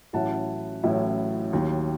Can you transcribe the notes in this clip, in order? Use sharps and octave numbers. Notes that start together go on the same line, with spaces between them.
A1 A2 F#3 C#4 E4 F#5 A5
A1 A2 F#3 C#4 E4
D#2 D#3 F#3